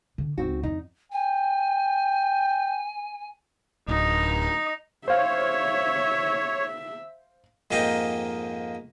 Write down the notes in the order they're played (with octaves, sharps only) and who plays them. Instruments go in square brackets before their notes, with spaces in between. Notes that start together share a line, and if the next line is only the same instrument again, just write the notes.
[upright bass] D3
[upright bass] C#2 D#4 [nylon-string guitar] C4 F#4
[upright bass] F2 [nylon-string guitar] D#4
[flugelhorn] G5 [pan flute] G#5
[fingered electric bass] D1 [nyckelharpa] D#4 D#5
[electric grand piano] C5 F5 [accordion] C#5 [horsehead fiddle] E5
[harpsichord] F2 G#2 A#3 D#5 F5 G5